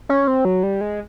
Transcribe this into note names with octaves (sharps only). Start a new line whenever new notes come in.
C#4
C4
F#3
G3
G#3